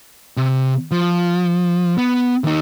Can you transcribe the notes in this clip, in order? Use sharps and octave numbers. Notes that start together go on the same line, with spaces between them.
C3
F3
B3
D#2 D#4